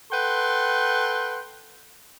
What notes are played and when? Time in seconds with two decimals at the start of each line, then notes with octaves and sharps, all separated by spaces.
0.11 A4 B4 F#5 G5 C6